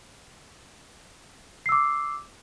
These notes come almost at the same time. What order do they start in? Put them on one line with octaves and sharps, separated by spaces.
C7 E6 D6